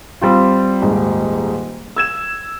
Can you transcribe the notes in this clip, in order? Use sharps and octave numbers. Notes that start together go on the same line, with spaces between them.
G3 C4 F4
D#1 G#2
E6 G#6 E7